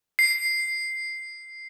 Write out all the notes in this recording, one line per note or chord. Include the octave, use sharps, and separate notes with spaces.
C7